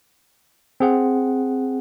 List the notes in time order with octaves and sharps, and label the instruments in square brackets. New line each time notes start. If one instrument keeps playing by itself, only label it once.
[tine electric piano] C4 G#4 F#5